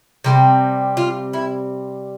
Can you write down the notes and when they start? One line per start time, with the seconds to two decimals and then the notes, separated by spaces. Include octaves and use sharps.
0.24 C3 G3 C4
0.97 F4
1.33 E4